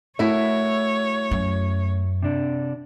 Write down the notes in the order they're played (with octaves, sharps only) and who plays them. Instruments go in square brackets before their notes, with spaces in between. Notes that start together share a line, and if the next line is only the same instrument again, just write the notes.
[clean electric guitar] A3 F#4 A#4 [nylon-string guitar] E4 E5 [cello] C#5
[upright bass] F#2
[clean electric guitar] C3 D4